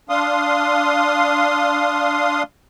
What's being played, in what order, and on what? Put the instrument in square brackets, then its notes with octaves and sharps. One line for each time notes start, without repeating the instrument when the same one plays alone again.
[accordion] D4 F5 C6 D#6